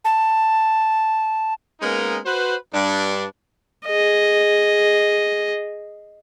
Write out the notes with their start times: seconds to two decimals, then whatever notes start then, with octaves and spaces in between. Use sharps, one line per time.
0.05 A5
1.81 G#3 A#3 B3 C#4 D#4 A#4
2.25 F#4 B4 C5
2.73 G2 D4
3.86 G#4 D#5